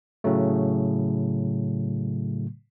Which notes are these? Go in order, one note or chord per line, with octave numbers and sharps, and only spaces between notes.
A2 C#3 F#3 A3